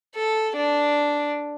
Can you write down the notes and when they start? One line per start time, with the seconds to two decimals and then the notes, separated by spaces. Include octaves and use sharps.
0.15 A4
0.56 D4